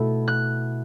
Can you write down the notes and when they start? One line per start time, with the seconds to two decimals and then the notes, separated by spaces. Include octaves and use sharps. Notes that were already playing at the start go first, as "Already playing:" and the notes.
Already playing: B2 A3 E4
0.28 F#6